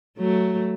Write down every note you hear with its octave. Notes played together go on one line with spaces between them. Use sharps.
F#3 A3